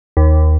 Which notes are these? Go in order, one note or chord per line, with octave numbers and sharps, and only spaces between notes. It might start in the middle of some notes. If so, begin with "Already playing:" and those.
D#2